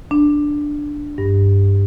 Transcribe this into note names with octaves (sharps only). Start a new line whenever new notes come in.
D4
G2